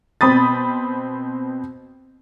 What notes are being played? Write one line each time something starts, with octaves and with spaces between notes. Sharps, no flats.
B2 C4 B5 D#6 A6